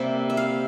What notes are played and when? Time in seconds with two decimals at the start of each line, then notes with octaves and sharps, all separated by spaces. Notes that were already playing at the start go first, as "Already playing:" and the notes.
Already playing: C3 G3 A#3 E5
0.30 E5
0.37 F5